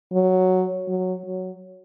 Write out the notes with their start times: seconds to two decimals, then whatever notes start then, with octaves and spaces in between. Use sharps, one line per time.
0.13 F#3
0.88 F#3
1.25 F#3